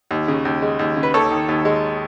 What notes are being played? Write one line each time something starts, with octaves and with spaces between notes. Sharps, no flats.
D#2
C#3
D#2
G#3
D#2
C#3
B4
D#2 A4 C#5
D#3
D#2
G#3